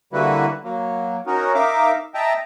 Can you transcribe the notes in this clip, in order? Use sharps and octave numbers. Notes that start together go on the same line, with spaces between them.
D3 G3 A#3 E4 F#4 B4
F#3 A#3
C#4 D#4 F#4 A#4
D#4 A#4 E5 F5 D6
D#5 E5 G5 A5 A#5